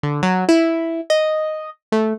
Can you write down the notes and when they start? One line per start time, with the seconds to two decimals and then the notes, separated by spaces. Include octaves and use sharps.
0.03 D3
0.23 F#3
0.49 E4
1.10 D#5
1.92 A3